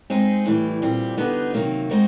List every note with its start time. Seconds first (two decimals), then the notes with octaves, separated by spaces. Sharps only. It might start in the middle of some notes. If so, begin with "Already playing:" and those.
0.10 G#3 C4 D#4 G#4
0.46 A2 E3 G3
0.82 A#2 G3 C4
1.17 D3 G3 B3 D#4
1.54 C3 D#3 F#3 A#3
1.89 G#3 C4 D#4 F#4